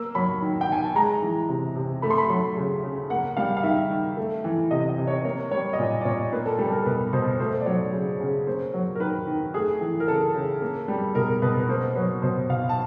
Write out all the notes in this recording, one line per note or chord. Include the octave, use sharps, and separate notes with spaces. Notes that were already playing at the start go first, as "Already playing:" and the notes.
Already playing: A#3 E6
F#3 B5
D#3
G5
D#3 G#5
A5
G#3 A#5
E3
C3
C3
A3 B5
C6
B5
F#3 C6
C#3
C#3
A#3 F#5
G3 F5
F5
D#3 E5
D#3
A3
E3
C3 D#5
D#5
C3
C#5
A#3 C#5
G3 C#5
D#5
A#2 D5
D5
A#2 C#5
A#3 B4
A4
G3 A4
A#4
B2 B4
B2 C5
A3 C5
D5
F#3 C#5
C#3
C#3
A#3 C5
F#3
A#4
D#3 B4
D#3
A3 G#4
E3
A#4
C#3 A4
C#3
A#3
G3
B2 A#4
B2 B4
B4
A#3 C5
F#3 B4
B2 C5
B2 F5
A5